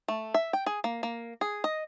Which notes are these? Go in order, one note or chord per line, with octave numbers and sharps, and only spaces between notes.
A3
E5
G5
G#4
A#3
A#3
G#4
D#5